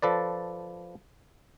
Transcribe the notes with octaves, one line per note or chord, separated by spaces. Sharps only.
F3 A4 B4 D5